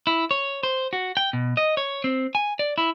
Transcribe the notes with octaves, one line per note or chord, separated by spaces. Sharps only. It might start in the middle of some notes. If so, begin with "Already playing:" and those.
E4
C#5
C5
F#4
G5
B2
D#5
C#5
C4
G#5
D5
E4